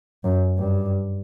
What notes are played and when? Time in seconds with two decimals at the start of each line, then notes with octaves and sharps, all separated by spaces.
0.24 F#2
0.57 G2